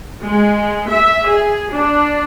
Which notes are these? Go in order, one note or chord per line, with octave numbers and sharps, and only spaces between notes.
G#3
E5
G#4
D4